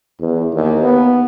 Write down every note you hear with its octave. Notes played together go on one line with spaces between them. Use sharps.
E2
D#2
B3